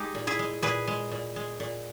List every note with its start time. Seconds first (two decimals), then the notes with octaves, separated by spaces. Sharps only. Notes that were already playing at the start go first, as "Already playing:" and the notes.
Already playing: G#3 D#4 G4
0.15 A#2
0.27 E4 G#4
0.39 G#3
0.62 A#2 G#4 B4
0.87 G#3
1.11 A#2
1.36 G#3
1.60 A#2